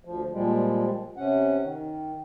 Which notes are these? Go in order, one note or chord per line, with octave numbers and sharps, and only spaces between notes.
D2 F3
A#2 F3 G3 G#3
C3 C#4 F#5
D#3